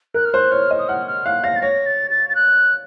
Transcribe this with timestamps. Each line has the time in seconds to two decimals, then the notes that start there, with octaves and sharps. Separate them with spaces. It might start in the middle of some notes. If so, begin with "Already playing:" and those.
0.14 A#4 F#6
0.25 F6
0.33 C5 F#6
0.52 C#5 F6
0.70 D#5
0.79 D#6
0.88 F#5 F6
1.07 F6
1.25 F5 F#6
1.44 F5 A#6
1.56 A6
1.62 C#5 A#6
1.86 A6
2.11 A6
2.29 A6
2.35 F#6